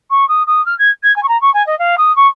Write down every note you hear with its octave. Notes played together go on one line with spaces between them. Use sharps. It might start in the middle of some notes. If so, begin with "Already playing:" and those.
C#6
D#6
D#6
F6
G#6
G#6
G#5
C#6
A#5
C#6
G#5
D#5
F5
D#6
C#6